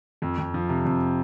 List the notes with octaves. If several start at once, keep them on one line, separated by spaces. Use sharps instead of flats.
F2
F2
F3
C3
F2